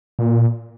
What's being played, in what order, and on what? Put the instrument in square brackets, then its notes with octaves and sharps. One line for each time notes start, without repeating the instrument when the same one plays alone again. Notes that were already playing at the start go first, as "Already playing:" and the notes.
[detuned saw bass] A#2